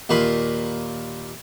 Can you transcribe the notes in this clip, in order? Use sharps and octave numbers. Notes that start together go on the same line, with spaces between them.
D#2 A#2 B4 B5 C6